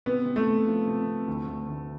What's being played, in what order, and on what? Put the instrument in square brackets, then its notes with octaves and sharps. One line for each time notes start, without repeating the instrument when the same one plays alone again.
[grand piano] C3 B3
C3
A3
C3
F3
C3
C3
D2
D2
D2